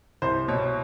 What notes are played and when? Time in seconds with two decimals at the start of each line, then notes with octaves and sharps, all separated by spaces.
0.22 C2 C5
0.48 B2 C#5